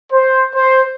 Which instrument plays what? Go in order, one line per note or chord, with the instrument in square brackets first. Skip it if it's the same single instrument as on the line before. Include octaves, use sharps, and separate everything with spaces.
[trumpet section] C5
C5